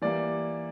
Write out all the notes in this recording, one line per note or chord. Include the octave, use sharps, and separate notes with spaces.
E3 G3 A#3 D5